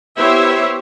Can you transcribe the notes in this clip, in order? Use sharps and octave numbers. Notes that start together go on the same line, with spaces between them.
B3 E4 G4 C5 C#5 E5